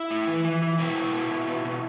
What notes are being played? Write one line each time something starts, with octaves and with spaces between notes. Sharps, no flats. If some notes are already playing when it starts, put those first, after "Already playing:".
Already playing: E4
A2
E3
E3
E3
B2 E4
B2
B2
B2
B2
B2